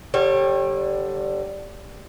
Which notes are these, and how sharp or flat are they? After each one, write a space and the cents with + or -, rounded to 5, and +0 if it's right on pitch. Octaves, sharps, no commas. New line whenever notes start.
D3 +10 G3 +0 C#5 -30